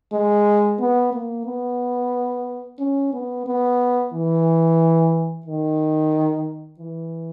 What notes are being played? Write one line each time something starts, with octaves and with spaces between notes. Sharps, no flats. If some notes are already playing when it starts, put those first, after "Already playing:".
G#3
B3
A#3
B3
C#4
B3
B3
E3
D#3
E3